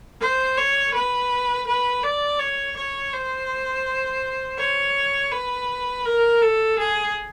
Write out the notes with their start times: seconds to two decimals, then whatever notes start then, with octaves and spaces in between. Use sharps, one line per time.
0.21 C5
0.57 C#5
0.94 B4
1.67 B4
2.03 D5
2.39 C#5
2.76 C#5
3.13 C5
4.58 C#5
5.32 B4
6.05 A#4
6.42 A4
6.78 G#4